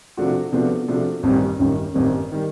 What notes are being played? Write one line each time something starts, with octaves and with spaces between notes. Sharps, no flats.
C3 F3 A3 D4 F#4
C3 F3 A3 B3 D4 F#4
C3 F3 A3 D4 F#4
A1 G2 D#3 G3 C4
A1 G2 D#3 G3 C#4
A1 G2 D#3 G3 C4
D#3 G3